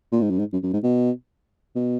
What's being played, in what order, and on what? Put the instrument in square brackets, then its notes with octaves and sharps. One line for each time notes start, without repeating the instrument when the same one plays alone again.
[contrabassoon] A#2
G#2
F#2
G#2
F#2
F#2
G#2
B2
B2